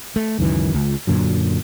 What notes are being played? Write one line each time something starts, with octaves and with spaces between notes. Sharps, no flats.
A3
C#2 F#2 D#3 E3
C#2
F#2 A#2 D3 F#3